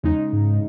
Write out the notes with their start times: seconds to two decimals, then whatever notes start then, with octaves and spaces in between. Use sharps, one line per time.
0.03 E2 C#3 G#3 D#4
0.33 G#2